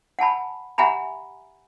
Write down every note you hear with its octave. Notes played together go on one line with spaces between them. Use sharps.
F#5 G#5 A5 B5
G4 E5 F#5 G#5 A#5 B5